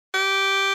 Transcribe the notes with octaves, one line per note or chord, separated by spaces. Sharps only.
G4